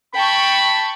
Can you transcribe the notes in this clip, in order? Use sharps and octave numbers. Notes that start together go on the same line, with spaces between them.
G5 A5 B5 C#6